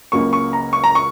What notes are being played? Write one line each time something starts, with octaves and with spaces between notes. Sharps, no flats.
C#2 C#3 F#3 A#3 C#6
C#6
A#5
C#6
A#5
C#6